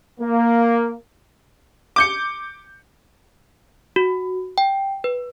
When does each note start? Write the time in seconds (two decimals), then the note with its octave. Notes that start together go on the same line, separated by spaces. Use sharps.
0.20 A#3
1.96 D6 G6 C#7
3.96 F#4
4.58 G5
5.04 B4